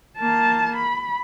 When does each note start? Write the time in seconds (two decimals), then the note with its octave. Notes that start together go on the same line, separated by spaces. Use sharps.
0.18 A#3 A5
0.76 B5